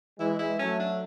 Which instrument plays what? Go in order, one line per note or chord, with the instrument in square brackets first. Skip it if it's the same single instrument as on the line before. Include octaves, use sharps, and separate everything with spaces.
[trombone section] E3 G#3 [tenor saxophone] E4
[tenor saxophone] E4
[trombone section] F#3 A3 [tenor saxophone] C#4
[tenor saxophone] D4